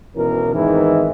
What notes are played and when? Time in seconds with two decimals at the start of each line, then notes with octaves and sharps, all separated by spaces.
0.16 G#1 B2 E3 C#4 A#4
0.53 E2 G#2 D#3 E3 C4 E4